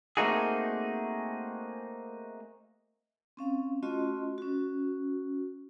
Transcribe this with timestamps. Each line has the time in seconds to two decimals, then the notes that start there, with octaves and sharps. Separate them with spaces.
0.17 A3 A#3 C4 D#4 F#4 G#4
3.37 C4 C#4 F5
3.83 A3 C#4 F4 F#4 D#5 C6
4.38 C#4 F#4